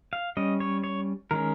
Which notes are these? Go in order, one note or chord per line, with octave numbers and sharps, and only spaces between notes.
F5
G3 C#4 D#5
C#5
C#5
D#3 G#3 C#4 A#4